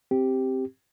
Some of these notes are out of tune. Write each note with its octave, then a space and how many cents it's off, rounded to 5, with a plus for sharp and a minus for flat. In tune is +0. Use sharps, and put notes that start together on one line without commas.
C4 +0 G4 +0